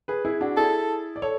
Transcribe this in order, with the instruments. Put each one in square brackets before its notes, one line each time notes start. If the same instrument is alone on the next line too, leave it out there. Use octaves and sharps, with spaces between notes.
[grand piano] G#4 B4
E4 G#4
D4 F#4
[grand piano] E4 G#4 [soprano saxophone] A4
[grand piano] D5
A4 C#5